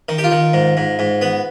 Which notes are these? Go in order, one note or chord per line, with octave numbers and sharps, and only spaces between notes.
D#3
G4
F4
D#3
G#2
G#2
G#2
B3